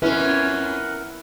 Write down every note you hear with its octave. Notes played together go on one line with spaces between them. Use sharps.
F2 C#4 E4 A#4 B4 F#5